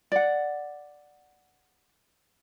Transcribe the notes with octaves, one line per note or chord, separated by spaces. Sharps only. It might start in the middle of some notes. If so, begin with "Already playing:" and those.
D5 F#5